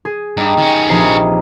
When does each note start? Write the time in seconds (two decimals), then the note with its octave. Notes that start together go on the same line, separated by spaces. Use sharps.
0.05 G#4
0.37 G2 D#4 G4
0.58 D#3 C#4
0.89 A#1 C3 E3 D#4 G#4 C7